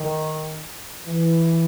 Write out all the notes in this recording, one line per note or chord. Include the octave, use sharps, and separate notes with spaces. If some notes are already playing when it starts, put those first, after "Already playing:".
Already playing: D#3
E3